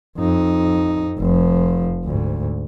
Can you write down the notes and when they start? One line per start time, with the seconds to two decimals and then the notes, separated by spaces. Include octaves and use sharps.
0.18 F2 D#4
1.19 F1 F3
2.05 D2 G#2